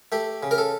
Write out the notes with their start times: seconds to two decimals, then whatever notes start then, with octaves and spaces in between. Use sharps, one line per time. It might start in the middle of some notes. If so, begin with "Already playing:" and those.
0.12 A3 G4
0.43 C#3
0.51 A#4
0.58 A4